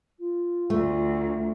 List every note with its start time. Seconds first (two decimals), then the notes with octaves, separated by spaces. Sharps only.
0.19 F4
0.70 D2 A3